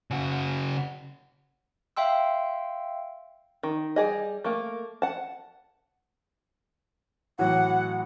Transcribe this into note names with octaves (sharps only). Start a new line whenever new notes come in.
C#3 F#4
E5 F5 G5 C6 E6
D#3
G3 G#4 D#5
A3 A#3
F#5 A5
A2 E3 F#3 F#5